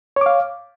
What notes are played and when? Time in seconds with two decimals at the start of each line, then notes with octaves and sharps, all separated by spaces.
0.16 C#5
0.21 D6
0.26 F5